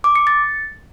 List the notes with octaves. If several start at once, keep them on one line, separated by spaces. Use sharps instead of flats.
D6
C#7
A6